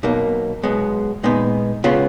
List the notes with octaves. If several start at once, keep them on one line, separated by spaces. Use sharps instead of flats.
B1 B2 A#3 D#4
B1 B2 G#3 B3
A#2 G#3 B3 D#4
C#3 G#3 B3 F4